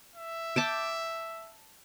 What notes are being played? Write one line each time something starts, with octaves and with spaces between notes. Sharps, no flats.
E5
G5 A5 D6